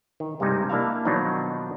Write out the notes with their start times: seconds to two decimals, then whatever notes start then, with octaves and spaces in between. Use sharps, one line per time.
0.20 D#3
0.40 G2 C3 G3 G#3 D#4
0.69 A#3 D4 E4 E5 F5
1.05 B2 D#3 F3 F#3 D4 D#4